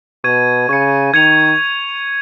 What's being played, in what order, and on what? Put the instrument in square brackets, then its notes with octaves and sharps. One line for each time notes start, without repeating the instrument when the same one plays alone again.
[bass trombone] B2 [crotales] C#6 G#6 D#7
[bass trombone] C#3 [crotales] C#6 G#6 C#7
[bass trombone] D#3 [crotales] G#6 C#7 F7